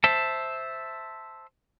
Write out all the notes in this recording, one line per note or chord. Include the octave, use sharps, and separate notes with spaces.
C5 E5 A5